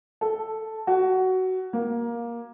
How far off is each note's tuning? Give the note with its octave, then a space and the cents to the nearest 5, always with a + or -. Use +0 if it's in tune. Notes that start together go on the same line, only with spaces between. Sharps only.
A4 +0
F#4 +15
A#3 +15